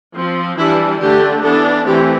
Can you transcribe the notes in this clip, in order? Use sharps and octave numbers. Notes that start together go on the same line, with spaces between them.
F3 C4
E3 G3 D4 E4
D3 A3 D4 G4
E3 B3 D4 A4
E3 A3 C4 G4